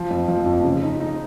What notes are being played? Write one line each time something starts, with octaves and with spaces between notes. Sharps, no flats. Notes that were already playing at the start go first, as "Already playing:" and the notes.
Already playing: F3
F2
F3
F2
C#3
D#4
D#4